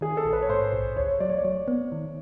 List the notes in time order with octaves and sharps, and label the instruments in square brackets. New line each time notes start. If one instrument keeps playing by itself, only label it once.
[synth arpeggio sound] D#3 [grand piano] G#4
[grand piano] A4
[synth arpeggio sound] A#1
[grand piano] B4
C#5
[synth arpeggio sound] G#2 [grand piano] C5
[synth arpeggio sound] A#1
[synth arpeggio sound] D2 [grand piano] C#5
[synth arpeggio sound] F#3 [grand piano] D5
[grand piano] C#5
D5
[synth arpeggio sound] F#3
B3
D#3